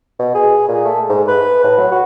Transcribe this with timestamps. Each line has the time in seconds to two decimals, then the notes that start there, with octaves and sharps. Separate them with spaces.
0.19 B2
0.35 G#4
0.68 A#2
0.85 A3
1.09 G#2
1.28 B4
1.64 A2
1.78 F#3
1.91 F#4